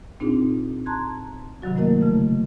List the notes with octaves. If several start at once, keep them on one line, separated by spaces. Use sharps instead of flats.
A#2 C4 D4 D#4 F4 G#4
A5 A#5 C6 F#6 G#6
G2 C3 D#3 F#3 F#4
F#3 A3 A#3 E4 A#4 D#5
C#3 F3 A3 E4